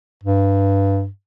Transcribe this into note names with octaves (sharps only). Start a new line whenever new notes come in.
G2